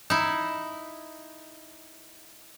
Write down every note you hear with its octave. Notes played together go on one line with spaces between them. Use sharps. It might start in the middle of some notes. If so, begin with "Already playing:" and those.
D#4 E4